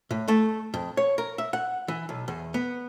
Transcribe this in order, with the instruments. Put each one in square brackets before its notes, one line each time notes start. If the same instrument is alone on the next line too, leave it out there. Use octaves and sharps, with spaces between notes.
[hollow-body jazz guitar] A2
A3
F2
C#5
A#4
E5
F#5
E3
B1
E2
B3